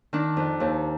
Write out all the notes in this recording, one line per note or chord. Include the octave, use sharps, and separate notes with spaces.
D#3 D4
F2
D#2